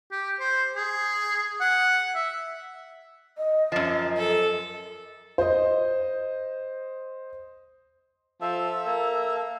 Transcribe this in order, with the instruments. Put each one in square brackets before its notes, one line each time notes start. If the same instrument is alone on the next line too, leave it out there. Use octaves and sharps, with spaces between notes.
[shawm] G4
C5
G#4
F#5
E5
[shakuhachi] D#5
[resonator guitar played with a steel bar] F#2 F3
[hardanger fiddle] A4
[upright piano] C5 D#5
[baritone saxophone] F3 [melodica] A4 E5
[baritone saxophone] A#3